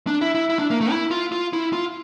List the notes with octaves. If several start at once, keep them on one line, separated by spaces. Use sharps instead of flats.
D4
E4
E4
E4
D4
A#3
A3
E4
F4
F4
E4
F4